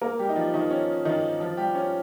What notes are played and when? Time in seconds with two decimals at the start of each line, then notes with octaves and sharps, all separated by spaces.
0.01 A#3 A#4
0.19 G3 G4
0.29 D#4
0.36 F3 F4
0.54 D#3 D#4
0.71 C#4
1.05 D#3 D#4
1.40 F3 F4
1.57 G3 G4
1.75 C#4